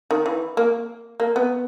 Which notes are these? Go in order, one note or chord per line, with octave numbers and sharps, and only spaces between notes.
D#3
E3
A#3
A#3
B3